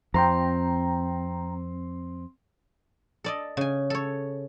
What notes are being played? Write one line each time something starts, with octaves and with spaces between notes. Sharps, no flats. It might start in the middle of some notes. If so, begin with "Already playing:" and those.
F2 C4 G5 A#5 C6
A4 D5 D#5
C#3 G#5
A4 C#5